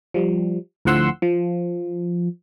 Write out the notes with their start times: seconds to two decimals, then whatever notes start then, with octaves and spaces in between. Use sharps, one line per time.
0.14 F3 G3
0.85 D2 A2 F3 F#5 C6 E6
1.22 F3